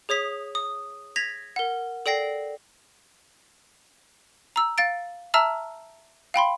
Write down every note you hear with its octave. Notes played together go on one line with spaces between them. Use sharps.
G#4 C#5 D#6 B6
D#6
G#6 A#6 B6 F7
A#4 F#5
A4 D5 G5 A#6 C7
A#5 E6
F5 A6 D7
E5 A5 A#5 E6 F6
F5 G5 B5 C6